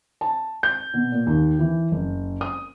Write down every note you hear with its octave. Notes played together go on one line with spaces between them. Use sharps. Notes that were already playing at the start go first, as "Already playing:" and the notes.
A5
G6
B2
A#2
D#2
E3
F#1
D#6